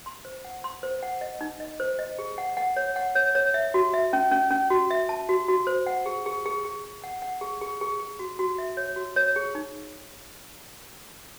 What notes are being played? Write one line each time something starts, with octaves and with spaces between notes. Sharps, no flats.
C6
C5
F#5
C6
C5
F#5
D#5
D#4
D#5
C5
D#5
G#4
F#5
F#5
C#5
F#5
C#5
C#5
E5
F#4
E5
C#4
C#4
C#4
F#4
E5
A5
F#4
F#4
C5
F#5
G#4
G#4
G#4
G#4
G#4
F#5
F#5
G#4
G#4
G#4
G#4
F#4
F#4
E5
C#5
F#4
C#5
G#4
D#4